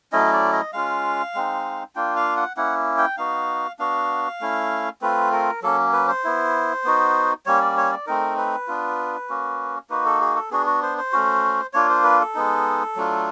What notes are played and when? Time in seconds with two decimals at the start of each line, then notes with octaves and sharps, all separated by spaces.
0.12 F#3 A3 C#4 E4 D#5
0.33 D5
0.53 D#5
0.73 G#3 C#4 F4 F5
1.34 G#3 C4 D#4
1.96 A#3 D4 F4 G5
2.16 F5
2.37 F#5
2.57 A#3 C#4 E4 F#5
2.98 G5
3.17 B3 D#4 F#4 F5
3.79 B3 D4 F#4 F5
4.41 A3 C#4 E4
5.01 A3 C4 F4 B4
5.32 A#4
5.62 F#3 A#3 C#4 A4
5.93 B4
6.08 C5
6.24 B3 E4
6.84 B3 D#4 F#4
7.46 G3 A#3 C#4 C#5
7.62 D5
7.77 C#5
7.92 D5
8.06 A3 C4 D#4 A#4
8.37 B4
8.68 B3 D4 F4
9.29 A#3 C#4 F#4
9.90 A#3 D#4 F#4 B4
10.05 A4
10.21 G#4
10.36 A4
10.51 B3 D4 F#4 G#4
10.66 F#4
10.83 C5
10.98 C5
11.12 A3 C#4 F#4
11.73 A#3 D4 F4 C#5
11.90 C5
12.04 B4
12.20 A4
12.35 G#3 B3 D#4
12.96 F#3 A3 D4 F4